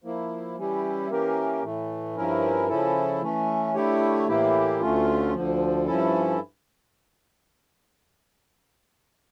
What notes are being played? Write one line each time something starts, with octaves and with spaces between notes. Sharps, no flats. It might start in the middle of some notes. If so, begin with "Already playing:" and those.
F3 A#3 E4
E3 G3 C#4 E4 G4
E3 A#3 C#4 G4 A#4
A2 E3 A3
G2 F3 C#4 E4 A#4
C#3 F3 C#4 E4 A4
E3 A3 C#4
D3 A3 E4 G4 C#5
A2 E3 A#3 E4 G4
D2 D3 A3 C#4 F4
D2 D3 F3
G2 F3 C#4 E4 A4